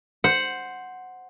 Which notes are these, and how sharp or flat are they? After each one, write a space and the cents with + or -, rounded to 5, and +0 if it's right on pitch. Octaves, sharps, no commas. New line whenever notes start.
C5 +0 F#5 +0